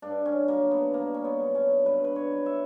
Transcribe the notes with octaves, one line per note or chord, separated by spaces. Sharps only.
G2 D4
C#4
D3 F#3 A#3
B3
G2 A#3
C#4
B3
D3 F#3
C#4
G2 B4
B4
C#5
F#3
E5